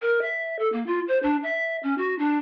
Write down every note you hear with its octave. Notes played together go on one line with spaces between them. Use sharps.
A#4
E5
A4
A#3
F4
C5
D4
E5
C#4
F#4
D4